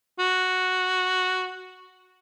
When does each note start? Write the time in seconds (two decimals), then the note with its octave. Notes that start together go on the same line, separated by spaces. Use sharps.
0.19 F#4